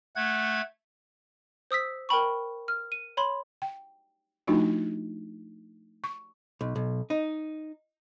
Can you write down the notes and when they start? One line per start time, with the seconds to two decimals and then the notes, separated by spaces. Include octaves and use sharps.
0.16 A3 F#5 G#6
1.71 C5 D#6 E6 B6
2.09 A#4 G5 B5 C#6
2.68 F6
2.92 D#7
3.17 C#5 B5 C6
3.62 G5
4.47 F3 A3 D4 D#4 F4 F#4
6.04 C#6
6.61 B1
6.76 B1
7.10 D#4